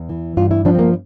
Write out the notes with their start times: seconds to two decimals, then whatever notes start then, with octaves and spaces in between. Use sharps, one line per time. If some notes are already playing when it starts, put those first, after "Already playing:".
Already playing: E2
0.09 E3
0.37 G2 F4
0.51 E4
0.65 F3 D4
0.74 C4
0.79 A#3